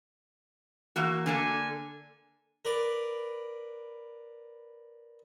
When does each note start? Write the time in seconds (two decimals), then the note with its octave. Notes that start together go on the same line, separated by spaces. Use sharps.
0.96 E3 A#3 F#4
1.26 D3 A#3 A4 G#5
2.65 A#4 B4 D5